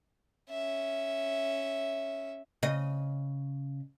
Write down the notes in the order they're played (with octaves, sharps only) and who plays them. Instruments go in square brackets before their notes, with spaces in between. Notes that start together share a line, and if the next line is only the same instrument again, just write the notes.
[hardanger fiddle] C#4 E5
[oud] C#3 D#5